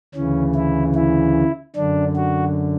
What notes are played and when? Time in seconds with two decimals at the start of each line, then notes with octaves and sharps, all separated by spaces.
0.15 D2 C#3 E3 C#4
0.55 E4
0.95 E4
1.76 F#2 D3 D4
2.16 F#4